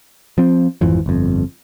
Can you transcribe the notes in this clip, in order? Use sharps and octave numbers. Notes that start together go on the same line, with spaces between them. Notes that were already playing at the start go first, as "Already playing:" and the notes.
F3 C4
G#1 F2 E3 F3
G1 F2